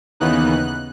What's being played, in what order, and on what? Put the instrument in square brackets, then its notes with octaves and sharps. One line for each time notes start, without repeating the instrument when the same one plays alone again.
[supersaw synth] D#2 C#3 E3 B3 D#4 F#6